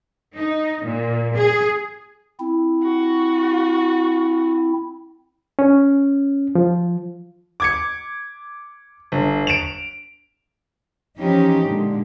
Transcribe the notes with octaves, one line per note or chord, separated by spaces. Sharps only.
D#4
A#2
G#4
C4 E4
F#4
C#4
F3
D6 G#6 C#7
G1
D7 E7 F7
E3 F3 C#4 D#4 G4
A#2 D3 G#3